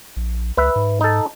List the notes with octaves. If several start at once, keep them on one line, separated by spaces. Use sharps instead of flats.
A#1
C#2 B4 E5
G#2
D#4 A4